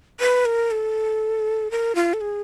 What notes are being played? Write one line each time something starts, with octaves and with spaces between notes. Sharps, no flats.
B4
A#4
A4
A#4
F4
A4
G#4